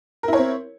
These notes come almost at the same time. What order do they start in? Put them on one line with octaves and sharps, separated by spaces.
A#4 E4 C#5 C4